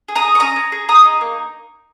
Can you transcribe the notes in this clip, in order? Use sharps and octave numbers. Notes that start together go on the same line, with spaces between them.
G#4
A#5 D#6
G#4
C#6
C#4 A#5 D#6
C#4
G#4
G#4 A#5 D#6
D#4
A#3